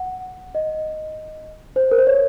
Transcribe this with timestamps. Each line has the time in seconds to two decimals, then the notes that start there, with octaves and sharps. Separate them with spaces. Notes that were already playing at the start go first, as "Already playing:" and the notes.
Already playing: F#5
0.55 D#5
1.76 C5
1.91 A#4
1.98 C5
2.07 C#5